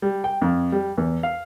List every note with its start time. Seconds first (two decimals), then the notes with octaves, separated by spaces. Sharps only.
0.02 G3
0.24 G5
0.42 F2
0.72 G3
0.98 E2
1.23 F5